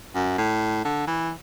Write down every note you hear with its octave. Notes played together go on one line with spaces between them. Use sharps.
F#2
A2
D3
E3